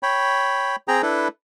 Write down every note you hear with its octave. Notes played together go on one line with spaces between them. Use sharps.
C#5 G5 B5
C4 G#4 G5 A#5
D4 E4 A4 B4